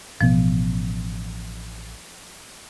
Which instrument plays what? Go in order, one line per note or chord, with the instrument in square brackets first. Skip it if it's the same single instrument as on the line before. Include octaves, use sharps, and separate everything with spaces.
[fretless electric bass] A1 B2 B3 [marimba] F3